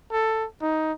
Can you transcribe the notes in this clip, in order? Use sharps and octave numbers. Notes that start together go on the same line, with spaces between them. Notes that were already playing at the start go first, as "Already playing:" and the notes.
A4
D#4